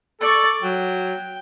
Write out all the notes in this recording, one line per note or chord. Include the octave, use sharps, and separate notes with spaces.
A4 D5 C#6
F#3 G5